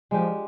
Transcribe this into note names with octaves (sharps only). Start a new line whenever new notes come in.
F3 G#3 D4 G4